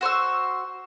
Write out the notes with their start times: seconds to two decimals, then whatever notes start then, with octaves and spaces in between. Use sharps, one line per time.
0.01 F#4 C5 C#6 E6